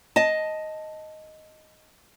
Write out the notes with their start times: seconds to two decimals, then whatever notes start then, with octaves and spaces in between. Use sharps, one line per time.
0.16 D#5 A5